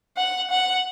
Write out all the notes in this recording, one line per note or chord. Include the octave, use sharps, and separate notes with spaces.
F#5
F#5